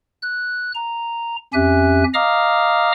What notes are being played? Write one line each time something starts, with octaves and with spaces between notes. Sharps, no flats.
F#6
A#5
F2 C#4 G4 E5 G#5 F#6
D#5 F5 A#5 D6 D#6 F6